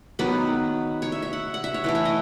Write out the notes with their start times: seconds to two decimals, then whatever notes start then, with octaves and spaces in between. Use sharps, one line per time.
0.19 D#3 F#3 B3 B4
1.02 C#5
1.12 E5
1.22 E5
1.33 F#5
1.54 F#5
1.64 E5
1.74 C#5
1.84 E3 A3 E4 B4
1.95 C#5
2.05 D#5